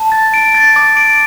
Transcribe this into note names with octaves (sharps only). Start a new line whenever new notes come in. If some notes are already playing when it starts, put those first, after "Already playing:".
Already playing: A5
A6
D7
A6
D6
D7